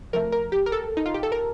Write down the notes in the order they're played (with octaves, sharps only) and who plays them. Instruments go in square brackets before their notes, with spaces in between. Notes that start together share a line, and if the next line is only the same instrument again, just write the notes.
[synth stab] C3 F3 A3 A#4
A#4
G4
A#4
A4
D#4
F4
G4
A4
A#4